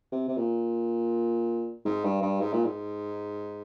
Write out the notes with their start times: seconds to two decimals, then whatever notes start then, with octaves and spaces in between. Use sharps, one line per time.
0.12 C3
0.28 C3
0.37 A#2
1.86 G#2
2.05 G2
2.22 G2
2.41 G#2
2.53 A#2
2.65 G#2